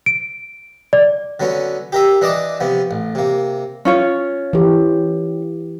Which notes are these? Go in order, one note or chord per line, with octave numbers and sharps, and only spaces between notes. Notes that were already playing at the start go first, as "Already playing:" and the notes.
D7
D5
D3 F#3 B3 C#4
G4 A#4 E5
E3 D4 D#5 A5 D6
C3 F3 B3
A1
C3 A#3
C#4 F4 C#5
E3 G4